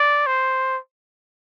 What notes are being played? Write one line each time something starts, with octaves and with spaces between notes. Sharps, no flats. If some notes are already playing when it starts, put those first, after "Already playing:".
Already playing: D5
C5